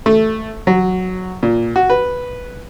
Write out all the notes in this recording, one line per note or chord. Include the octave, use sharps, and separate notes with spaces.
A3
F#3
A#2
F#4
B4